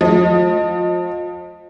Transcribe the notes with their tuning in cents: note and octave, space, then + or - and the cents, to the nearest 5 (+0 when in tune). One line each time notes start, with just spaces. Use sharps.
F3 +30 D#5 +0